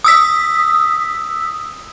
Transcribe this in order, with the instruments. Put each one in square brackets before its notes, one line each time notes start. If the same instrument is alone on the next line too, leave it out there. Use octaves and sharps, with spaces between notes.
[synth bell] D#6 E6 B6